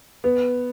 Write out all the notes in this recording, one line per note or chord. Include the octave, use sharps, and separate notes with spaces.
B3